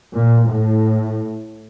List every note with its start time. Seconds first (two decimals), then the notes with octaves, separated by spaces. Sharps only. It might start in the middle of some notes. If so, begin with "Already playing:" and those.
0.14 A#2
0.47 A2